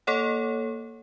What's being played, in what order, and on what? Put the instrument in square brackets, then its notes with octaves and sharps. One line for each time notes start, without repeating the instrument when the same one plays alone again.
[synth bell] A#3 A4 C#5 F#5